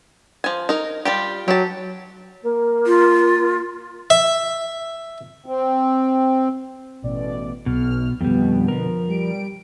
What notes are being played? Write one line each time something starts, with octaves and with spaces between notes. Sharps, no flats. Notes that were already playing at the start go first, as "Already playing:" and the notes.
F3 G#5
D#4 A#4
G3 F4 G4
F#3 G4 A5
A#3
F4
E5
C4
A1 B2 D5
B1 B2 F6
F2 B2 D3 G3 B3
F3 A#4
G3 D7